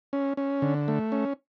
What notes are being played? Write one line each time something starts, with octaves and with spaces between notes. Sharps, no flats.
C#4
C#4
D3
A3
C#4